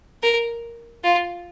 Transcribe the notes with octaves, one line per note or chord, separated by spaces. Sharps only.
A#4
F4